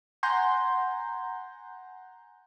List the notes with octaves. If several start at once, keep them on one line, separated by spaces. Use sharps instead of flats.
F#5 G#5 A#5 C6 G6